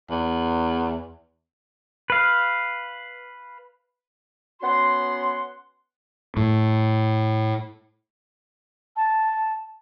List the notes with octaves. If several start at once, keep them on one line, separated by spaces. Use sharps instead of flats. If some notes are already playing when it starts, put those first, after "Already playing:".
E2
B4 F5
B3 C#4 F#4 F#5 C6
A2
A5